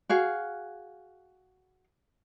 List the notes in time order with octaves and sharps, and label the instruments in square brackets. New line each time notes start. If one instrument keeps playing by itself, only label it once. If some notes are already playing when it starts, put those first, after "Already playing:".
[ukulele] F#4 G#4 F5